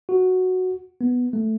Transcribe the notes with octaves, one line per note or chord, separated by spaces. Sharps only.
F#4
B3
A3